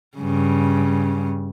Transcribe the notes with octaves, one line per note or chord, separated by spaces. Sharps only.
G2 C#3